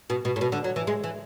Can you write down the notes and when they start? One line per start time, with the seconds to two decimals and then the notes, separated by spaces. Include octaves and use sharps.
0.10 B2
0.25 B2
0.36 A2
0.41 B2
0.52 D3
0.64 F#3
0.76 E3
0.87 G#3
1.04 E3